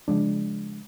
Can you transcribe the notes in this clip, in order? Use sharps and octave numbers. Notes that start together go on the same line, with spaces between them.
C#3 F3 G#3 D4